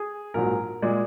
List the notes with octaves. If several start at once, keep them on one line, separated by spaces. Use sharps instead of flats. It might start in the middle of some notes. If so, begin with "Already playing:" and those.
Already playing: G#4
A#1 G#2 F#3 A#4
A#2 G#3